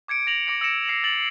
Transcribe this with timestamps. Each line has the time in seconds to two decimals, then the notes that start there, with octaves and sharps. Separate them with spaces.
0.08 D6 G#6 C#7 D7
0.27 A#6 D7 F7 F#7
0.46 D6 A#6 C#7 D7
0.61 E6 A#6 C#7 D7 E7
0.88 E6 C7 C#7 E7
1.04 A6 F#7